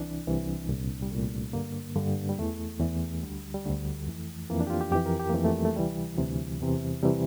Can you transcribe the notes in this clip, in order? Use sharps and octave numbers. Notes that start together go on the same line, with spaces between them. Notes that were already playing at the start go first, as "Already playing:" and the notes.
Already playing: C2 C3 E3 D4
C2 C3 E3
C2 A#2
G3
C2 A#2 A3
G2 D3 A#3
G2 D3
G3
E2 E3 A3
E2 E3
D2 D3 G3
G3
D2 D3 A3
F2 E3
F2 E3 A#3
D4
G4
F4
G4
F2 E3 G4
A#4
G4
A#3
F2 E3 A3
A3
G3
A3
D2 C3 E3 G3
D2 C3 E3
E2 C3 E3
C3 E3 G3